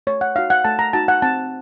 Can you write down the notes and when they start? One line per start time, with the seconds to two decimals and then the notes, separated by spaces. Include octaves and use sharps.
0.07 A3 C#5
0.21 F#5
0.36 D#4 F#4 F5
0.50 F#5
0.65 A3 A5
0.79 A#5
0.93 D#4 F#4 A5
1.08 F#5
1.22 C4 A5